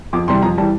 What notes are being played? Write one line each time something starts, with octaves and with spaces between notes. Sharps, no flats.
F2 D6
C3 E3 G3 C6
F2 A#5
E3 G3 A5